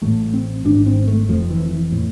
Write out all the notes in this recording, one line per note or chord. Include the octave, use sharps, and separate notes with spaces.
A1 A2 A3
C4
G#1 G#2 D4
C4
A3
F1 F2 C3 F3
E3
E3
A2